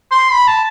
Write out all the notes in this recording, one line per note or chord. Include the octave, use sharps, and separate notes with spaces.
C6
B5
A5